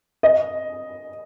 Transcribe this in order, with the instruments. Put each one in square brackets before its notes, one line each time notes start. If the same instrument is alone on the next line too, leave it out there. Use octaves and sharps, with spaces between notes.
[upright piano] D#5